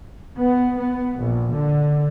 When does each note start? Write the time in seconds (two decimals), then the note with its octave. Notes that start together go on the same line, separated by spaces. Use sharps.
0.37 B3
0.79 B3
1.20 A#1
1.53 D3